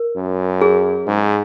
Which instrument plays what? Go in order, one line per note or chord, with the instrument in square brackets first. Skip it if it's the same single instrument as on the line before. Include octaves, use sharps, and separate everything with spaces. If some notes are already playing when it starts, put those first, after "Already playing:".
Already playing: [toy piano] A#4
[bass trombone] F#2
[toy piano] G#4
[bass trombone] G#2